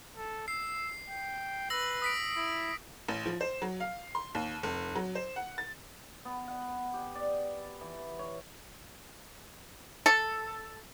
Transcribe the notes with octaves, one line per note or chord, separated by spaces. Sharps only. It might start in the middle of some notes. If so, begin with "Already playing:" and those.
A4
E6 C7
G5
B4 E6 A#6 F#7
D#6 B6 D7
E4
A1
F3
C5
F#3
F5
C6
D#2
F1
F#3
C5
F#5
A6
B3
F#5
G4
D5
E3
C#5
A4